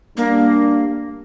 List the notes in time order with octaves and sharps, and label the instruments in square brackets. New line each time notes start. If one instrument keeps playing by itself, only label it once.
[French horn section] G3 D4 [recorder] A#3